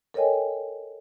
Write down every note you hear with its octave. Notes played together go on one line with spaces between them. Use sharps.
A4 A#4 C#5 D#5 G5 G#5